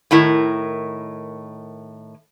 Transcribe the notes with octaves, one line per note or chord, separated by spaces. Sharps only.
A2 D#3 E4 A#4